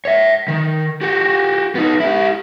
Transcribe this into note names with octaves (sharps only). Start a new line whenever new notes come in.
C#5 E5
D#3
F#4 G4
B3 D#4
E4 G4